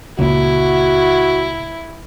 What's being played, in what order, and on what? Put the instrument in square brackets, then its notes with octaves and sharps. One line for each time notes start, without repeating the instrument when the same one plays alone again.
[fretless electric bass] C#2 A#2 [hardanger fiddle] E4 [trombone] F#4